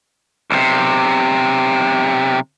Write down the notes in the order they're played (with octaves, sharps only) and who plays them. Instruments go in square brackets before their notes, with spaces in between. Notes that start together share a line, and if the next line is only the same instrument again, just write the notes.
[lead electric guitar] B1 C3